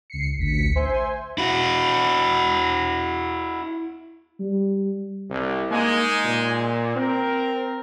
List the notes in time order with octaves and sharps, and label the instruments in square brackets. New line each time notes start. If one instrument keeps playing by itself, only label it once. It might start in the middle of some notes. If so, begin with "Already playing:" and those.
[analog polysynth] C#2 C7 C#7
A1 D2 B6 C#7
C5 E5 G#5 C6
[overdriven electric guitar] E4 F#4
[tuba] G3
[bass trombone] C2
[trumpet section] G#3 D#4 G#5 [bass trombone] A#3
[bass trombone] A#2
[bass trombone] C4 [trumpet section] A#4